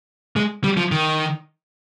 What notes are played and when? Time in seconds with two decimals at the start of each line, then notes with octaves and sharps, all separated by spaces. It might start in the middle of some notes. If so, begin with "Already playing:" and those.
0.36 G#3
0.64 G3
0.77 F3
0.92 D#3